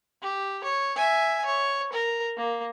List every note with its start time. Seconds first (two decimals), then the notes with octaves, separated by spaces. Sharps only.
0.22 G4
0.64 C#5
0.96 E5 G#5
1.45 C#5
1.93 A#4
2.37 A#3